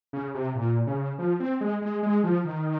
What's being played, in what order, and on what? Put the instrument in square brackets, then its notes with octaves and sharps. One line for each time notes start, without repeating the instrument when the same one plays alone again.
[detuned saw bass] C#3
C3
A#2
C#3
F3
C4
G#3
G#3
G#3
F3
D#3